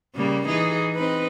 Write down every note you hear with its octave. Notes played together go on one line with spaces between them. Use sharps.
C#3 G3 A#3
E3 D#4 G#4
C4 D#4 B4